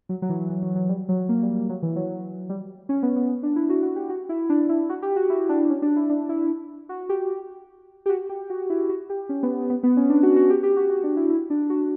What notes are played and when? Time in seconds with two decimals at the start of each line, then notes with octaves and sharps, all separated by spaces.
0.09 F#3
0.22 F#3
0.29 E3
0.50 E3
0.63 F#3
0.76 F#3
0.89 G3
1.09 F#3
1.29 A#3
1.42 G3
1.69 F#3
1.82 E3
1.96 F#3
2.49 G3
2.89 C#4
3.03 B3
3.16 B3
3.29 B3
3.43 D4
3.56 E4
3.69 F#4
3.83 F#4
3.96 G4
4.10 F#4
4.29 E4
4.50 D4
4.69 E4
4.89 F#4
5.02 G4
5.16 F#4
5.30 E4
5.49 D4
5.70 C#4
5.82 D4
5.96 E4
6.10 D4
6.29 E4
6.89 F#4
7.09 G4
8.06 G4
8.09 F#4
8.29 G4
8.50 F#4
8.70 E4
8.89 F#4
9.10 G4
9.29 C#4
9.43 B3
9.70 B3
9.83 B3
9.97 C#4
10.09 D4
10.23 F#4
10.36 F#4
10.50 G4
10.63 G4
10.77 F#4
10.90 F#4
11.04 D4
11.16 E4
11.30 E4
11.50 D4
11.70 F#4